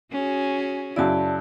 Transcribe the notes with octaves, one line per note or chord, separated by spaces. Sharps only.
C#4 F#4 G#4
F#2 C#3 E4 D5 A5